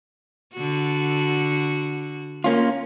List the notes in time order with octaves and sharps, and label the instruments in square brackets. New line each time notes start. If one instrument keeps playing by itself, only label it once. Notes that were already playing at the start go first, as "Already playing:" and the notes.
[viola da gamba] D3 F#4
[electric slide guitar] A#3 C#4 F4